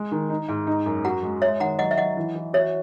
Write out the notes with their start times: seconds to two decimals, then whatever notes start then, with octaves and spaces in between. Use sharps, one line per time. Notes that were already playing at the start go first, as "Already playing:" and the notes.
Already playing: G#3
0.12 D#3
0.30 D#4
0.48 G#2
0.67 D#4
0.86 F#2
1.05 F#4 F#5 A#5
1.23 G#3
1.42 G#3 C#5 E5
1.60 D#3 F#5 A#5
1.79 F#3 D#5 F#5
1.91 E5
1.98 F#3 D#5 F#5
2.16 E3
2.35 E3
2.53 F#4 C#5 E5